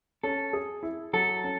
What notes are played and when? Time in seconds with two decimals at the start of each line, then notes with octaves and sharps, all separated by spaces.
0.23 C#4 A4
0.53 G#4
0.83 E4
1.13 F#3 A4
1.44 C#4